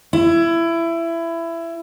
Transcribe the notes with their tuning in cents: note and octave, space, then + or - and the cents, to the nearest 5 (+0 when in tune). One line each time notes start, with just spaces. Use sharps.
E4 +20